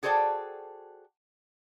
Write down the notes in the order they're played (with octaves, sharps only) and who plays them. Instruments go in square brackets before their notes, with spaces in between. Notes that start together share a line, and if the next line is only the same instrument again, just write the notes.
[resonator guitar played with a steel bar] F#4 G#4 A4 C5 D5 G5